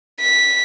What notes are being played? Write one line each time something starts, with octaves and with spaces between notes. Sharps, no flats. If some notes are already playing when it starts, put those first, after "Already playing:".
B6